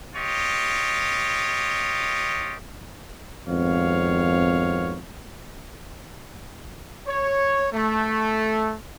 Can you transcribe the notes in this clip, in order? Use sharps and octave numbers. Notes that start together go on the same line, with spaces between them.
F4 G4 C#5 D#5
G#1 F2 B3 C#5 F5
C#5
A3